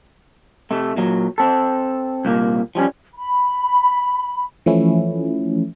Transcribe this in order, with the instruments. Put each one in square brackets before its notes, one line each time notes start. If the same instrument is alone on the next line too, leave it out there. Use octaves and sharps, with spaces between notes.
[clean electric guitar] C3 A3
A#2 F#3
C4 A4
C2 A#2 A#3
F3 G3 C#4
[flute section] B5
[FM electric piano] E3 F3 A3 C#4 E4